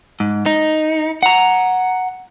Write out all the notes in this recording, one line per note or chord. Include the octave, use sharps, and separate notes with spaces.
G#2
D#4
F#5 A#5